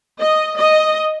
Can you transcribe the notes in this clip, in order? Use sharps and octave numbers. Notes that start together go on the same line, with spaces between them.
D#5
D#5